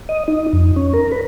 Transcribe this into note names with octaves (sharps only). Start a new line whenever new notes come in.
D#5
D#4
F2
C#4
A#4
B4